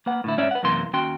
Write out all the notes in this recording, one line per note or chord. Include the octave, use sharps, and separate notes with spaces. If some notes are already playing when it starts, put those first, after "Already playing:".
A#3 B4 F#5
A2 D3 E4
G#2 C#4 D5 E5
B4 F#5
F#2 C3 E3 A#3 C6
D#2 C#4 F#4 G5 C6